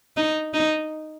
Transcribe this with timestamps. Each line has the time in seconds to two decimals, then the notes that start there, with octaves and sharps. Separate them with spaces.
0.17 D#4
0.54 D#4